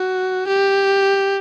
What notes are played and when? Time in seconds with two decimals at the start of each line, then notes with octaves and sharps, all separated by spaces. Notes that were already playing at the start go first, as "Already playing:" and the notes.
Already playing: F#4
0.47 G4